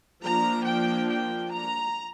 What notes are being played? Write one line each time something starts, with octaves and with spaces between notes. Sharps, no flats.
F3 A#3 D4 A#5
G5
G5
A#5